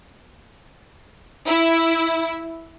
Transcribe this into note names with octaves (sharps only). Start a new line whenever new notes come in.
E4